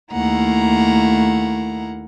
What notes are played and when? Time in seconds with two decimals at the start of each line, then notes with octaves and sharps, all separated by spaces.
0.11 D#2 A3 A#3 E4 F#5 A#5